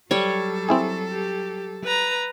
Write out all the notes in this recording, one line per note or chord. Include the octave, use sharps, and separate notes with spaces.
F#3 G3 A4 C#5
C4 E4 G#4
G4
B4 A#5